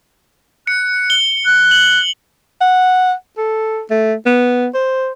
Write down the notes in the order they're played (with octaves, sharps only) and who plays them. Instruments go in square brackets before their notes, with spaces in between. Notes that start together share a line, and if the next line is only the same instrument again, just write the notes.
[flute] F#6 [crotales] C#7
[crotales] G7
[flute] F#6
[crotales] F#7
[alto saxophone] F#5
A4
A3
B3
C5